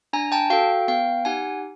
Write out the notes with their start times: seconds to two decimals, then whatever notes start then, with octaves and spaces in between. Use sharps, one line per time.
0.13 D4 G#5 A#5
0.32 G5 A5
0.50 F#4 A4 F5 G5
0.88 B3 F5 G5
1.25 D#4 G4 F#5 G#5